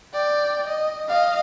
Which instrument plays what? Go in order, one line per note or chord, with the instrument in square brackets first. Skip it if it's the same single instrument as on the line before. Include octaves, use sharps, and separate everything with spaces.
[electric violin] D5 G5
D#5
D#5 F5